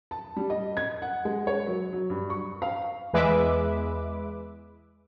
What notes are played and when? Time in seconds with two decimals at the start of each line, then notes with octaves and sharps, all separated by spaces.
0.11 A5
0.36 G3
0.50 D#5
0.77 G#6
1.02 F#5
1.25 G#3
1.47 C#5
1.67 F#3
1.93 F#3
2.10 G2
2.30 C#6
2.62 F5
3.13 E2 G#3 B4 E5 D6